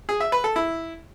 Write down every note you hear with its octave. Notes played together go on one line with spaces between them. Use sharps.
G#4
E5
B4
A4
E4